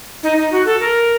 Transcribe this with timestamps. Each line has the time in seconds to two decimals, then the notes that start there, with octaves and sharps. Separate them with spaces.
0.23 D#4
0.37 D#4
0.52 F#4
0.66 A4
0.80 A#4